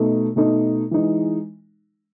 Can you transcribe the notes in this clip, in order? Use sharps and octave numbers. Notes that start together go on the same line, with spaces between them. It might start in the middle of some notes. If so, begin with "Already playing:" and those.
Already playing: B2 A3 D#4
B2 A3 D#4
E3 G#3 D#4